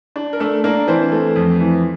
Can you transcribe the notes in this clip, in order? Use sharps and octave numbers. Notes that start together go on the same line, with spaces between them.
D4
A#4
A3 D4 A4
A#3 D4 A#4
E3 C4 C5
A3
F2
E3